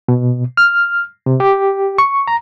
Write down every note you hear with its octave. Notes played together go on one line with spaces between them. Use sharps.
B2
F6
C3
G4
C#6
A#5